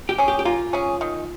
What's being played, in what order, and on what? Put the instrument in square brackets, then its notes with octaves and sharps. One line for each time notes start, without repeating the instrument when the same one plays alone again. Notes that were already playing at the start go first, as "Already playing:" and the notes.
[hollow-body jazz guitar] G4
[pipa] C#4 G#4
[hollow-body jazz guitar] G4
G4
[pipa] A#3 [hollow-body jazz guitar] F4
[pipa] C#4 G#4
D#3